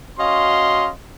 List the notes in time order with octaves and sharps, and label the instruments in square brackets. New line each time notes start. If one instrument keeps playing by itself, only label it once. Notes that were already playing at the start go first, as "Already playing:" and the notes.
[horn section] C#4 F#4 D#5 F5 C6